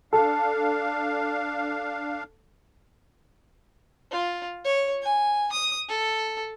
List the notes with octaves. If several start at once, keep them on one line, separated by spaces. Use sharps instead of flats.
D4 A4 F5
F4
C#5
G#5
D#6
A4